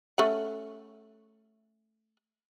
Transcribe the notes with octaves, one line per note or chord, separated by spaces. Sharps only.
A3 C#4 F#5